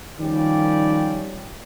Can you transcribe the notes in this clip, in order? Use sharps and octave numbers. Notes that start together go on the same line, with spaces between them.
D#3 F3 G3 C#4 G4 D5